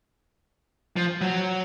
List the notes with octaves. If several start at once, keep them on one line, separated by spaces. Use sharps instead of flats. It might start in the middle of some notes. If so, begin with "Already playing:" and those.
F3
F#3